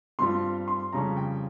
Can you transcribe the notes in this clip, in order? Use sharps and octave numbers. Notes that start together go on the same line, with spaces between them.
G2 G3 C4 F4 C6
C6
F2 C#3 G3 C#4 A#5
G5